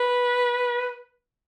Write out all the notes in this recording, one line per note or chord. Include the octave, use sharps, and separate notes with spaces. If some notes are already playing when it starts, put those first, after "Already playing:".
Already playing: B4